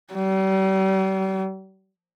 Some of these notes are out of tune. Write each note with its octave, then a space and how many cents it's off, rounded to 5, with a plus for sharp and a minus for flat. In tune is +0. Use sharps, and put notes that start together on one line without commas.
G3 -40